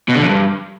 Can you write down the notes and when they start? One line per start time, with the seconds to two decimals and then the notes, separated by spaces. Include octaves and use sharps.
0.08 B2
0.15 D3
0.22 F2
0.29 G2